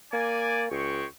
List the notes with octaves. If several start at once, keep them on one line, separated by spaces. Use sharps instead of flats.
A#3 D5 G#5
C#2 G#3 G5 C#6